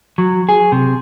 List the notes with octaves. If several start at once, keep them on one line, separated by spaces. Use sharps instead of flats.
F#3
G#4
C3